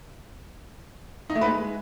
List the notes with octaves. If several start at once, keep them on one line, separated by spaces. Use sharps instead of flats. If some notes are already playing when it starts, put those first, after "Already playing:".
D#4
A3
B4
G#3